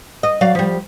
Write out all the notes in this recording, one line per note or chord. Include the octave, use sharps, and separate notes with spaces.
D#5
F#3 D5 F5
F3 G3